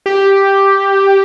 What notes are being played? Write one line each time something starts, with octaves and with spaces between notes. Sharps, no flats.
G4